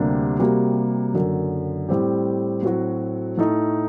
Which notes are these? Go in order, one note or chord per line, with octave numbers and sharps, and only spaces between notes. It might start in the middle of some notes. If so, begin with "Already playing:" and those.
Already playing: D2 C3 G3 A#3 D4
C3 G3 A#3 F#4
F#1 F#2 D3
A2 G3 C4 G4
A2 F#3 C4 F#4
A2 A3 D#4